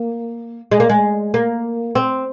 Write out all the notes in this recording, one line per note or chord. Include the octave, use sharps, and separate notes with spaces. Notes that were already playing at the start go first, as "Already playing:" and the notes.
Already playing: A#3
G#3
A#3
G#3
A#3
C4